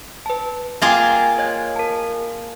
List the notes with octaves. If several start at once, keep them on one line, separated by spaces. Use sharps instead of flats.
B4 A5
A#3 F4 G#4 F5 G5
C#5 D#5 G#6
A#4 A5